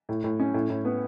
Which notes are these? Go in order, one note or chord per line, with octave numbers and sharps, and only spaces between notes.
A2
A2
C#4
A2
A2
B3